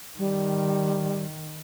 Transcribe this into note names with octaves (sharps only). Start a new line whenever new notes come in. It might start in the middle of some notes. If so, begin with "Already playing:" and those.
D#3 G3